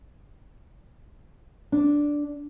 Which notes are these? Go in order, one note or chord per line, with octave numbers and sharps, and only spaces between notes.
D4